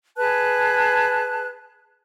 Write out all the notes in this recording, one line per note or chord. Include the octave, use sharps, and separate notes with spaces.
G#4 B4 A5 F#6